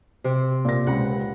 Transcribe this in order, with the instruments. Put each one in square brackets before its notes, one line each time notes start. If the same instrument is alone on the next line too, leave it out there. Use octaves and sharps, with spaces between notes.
[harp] C3
[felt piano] A#2 A#4 A#6
[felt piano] C#2 G4 [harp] F#5 B5